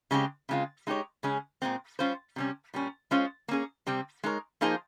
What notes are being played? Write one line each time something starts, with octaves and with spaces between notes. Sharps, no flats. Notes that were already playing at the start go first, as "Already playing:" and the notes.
C#3 G#3 C4 D#4 G4
C#3 G#3 C4 F4
G#3 D#4 G4 C#5
C#3 G#3 C#4 G#4
A#2 G#3 C4
G3 C#4 F4 C5
C3 G3 C#4
A#2 G3 C#4
G#3 C#4 F4 C5
A#3 C#4 G#4
C3 G3 C4
G#3 D#4 A#4 C#5
F3 A#3 D#4 G#4 C5